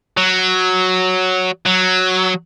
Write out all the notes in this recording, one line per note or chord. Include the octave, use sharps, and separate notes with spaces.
F#3
F#3